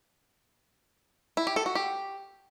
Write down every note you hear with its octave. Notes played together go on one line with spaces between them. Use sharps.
E4
G4
A4
F#4
G4